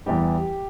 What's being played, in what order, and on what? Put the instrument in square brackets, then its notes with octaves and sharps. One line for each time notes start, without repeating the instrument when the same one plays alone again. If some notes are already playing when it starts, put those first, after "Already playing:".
[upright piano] E2 E3 G3 G4